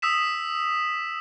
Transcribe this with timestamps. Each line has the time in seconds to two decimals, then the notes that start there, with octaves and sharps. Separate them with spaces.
0.02 D#6 E6 B6 E7